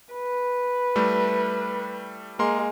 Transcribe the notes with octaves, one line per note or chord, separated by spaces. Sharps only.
B4
G3 A3 E4
G#3 A#3 A#4 C6